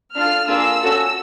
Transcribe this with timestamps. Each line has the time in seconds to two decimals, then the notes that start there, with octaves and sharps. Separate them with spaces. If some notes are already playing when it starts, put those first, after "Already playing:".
0.15 D4 F4 A4 F6
0.47 A#3 D4 F4 G#4 E6
0.80 C#4 F#4 A4